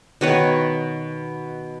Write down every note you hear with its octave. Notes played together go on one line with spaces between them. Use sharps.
B2 D#3 B4 C#5